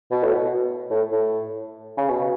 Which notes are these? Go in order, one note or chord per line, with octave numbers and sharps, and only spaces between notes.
B2
A2
B2
A2
A2
C#3
B2